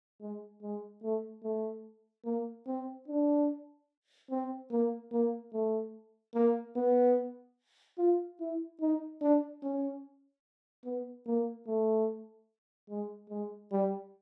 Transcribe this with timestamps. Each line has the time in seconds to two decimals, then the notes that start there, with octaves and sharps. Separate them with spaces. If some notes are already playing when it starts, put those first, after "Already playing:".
0.21 G#3
0.63 G#3
1.03 A3
1.43 A3
2.25 A#3
2.67 C4
3.08 D4
4.31 C4
4.71 A#3
5.13 A#3
5.53 A3
6.35 A#3
6.76 B3
7.98 F4
8.40 E4
8.81 D#4
9.22 D4
9.63 C#4
10.85 B3
11.27 A#3
11.67 A3
12.90 G#3
13.30 G#3
13.72 G3